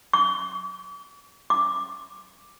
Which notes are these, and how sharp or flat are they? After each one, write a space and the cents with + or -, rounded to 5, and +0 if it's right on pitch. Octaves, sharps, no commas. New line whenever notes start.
D6 -45
D6 +0